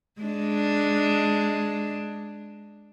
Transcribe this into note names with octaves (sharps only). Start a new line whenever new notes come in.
G#3 D4